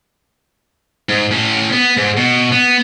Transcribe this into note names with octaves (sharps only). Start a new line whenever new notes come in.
G#2
A2 C#4
B3
G#2
B2
B3